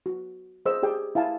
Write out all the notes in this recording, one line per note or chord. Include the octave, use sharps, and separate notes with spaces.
F#4
G#4 C5 D#5 C6 E6
G4 G#4 D5 G5
E4 F5 G#5 A5